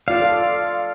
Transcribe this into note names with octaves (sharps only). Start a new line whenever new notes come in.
F4 D5 F5
A4